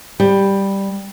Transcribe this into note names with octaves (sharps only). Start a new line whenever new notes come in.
G3